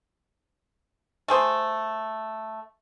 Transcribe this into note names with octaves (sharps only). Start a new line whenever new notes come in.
A3 G#4 C5